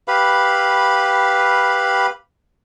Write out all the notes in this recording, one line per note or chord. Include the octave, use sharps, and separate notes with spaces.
G4 B4 F5 B5